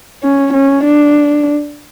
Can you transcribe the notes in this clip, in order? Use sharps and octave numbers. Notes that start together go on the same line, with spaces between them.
C#4
C#4
D4